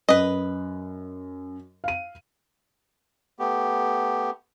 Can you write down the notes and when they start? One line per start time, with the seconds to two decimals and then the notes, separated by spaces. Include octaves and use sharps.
0.09 F#2 B4 D#5
1.84 F5 D#7
3.39 A3 B3 G4